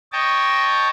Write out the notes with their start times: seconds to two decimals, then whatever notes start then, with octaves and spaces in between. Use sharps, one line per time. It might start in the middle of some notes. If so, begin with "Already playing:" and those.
0.12 C#5 D#5 G5 A5